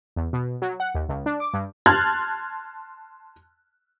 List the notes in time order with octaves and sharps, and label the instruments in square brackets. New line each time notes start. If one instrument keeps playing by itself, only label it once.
[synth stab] E2
B2
F#3
F#5
D#2
C#2
D4
D6
G2
[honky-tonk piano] A5 C6 F6 F#6 G#6 A6